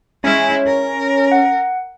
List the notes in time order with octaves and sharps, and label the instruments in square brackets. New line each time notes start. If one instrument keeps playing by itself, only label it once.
[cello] G#3 E4 [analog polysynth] C#4
[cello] A#4
[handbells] F#5